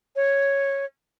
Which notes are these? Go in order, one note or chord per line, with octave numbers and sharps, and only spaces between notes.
C#5